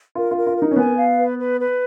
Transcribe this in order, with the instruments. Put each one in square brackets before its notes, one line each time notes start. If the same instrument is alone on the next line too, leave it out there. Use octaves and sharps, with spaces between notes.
[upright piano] F4 [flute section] A#4
[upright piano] F4
[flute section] A#4
[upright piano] F4
[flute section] A#4
[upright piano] D#4
C#4
[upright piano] B3 [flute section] G#5
[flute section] F5
B4
B4
B4